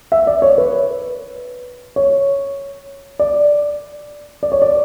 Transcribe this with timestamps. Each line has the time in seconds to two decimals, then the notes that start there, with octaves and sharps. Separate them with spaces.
0.12 E5
0.27 D5
0.42 C#5
0.58 B4
1.96 C#5
3.19 D5
4.43 D5
4.52 C#5
4.62 D5